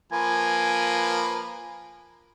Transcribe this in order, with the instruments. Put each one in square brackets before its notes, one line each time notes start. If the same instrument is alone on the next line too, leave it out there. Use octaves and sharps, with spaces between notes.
[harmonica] F3 A#3 B4 [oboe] G#5